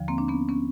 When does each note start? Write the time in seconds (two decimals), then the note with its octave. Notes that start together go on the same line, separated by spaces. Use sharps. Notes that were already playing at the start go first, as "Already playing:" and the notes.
Already playing: D#2 D3 F3
0.08 A#3 C4
0.18 D4
0.28 B3 C#4
0.49 B3 C#4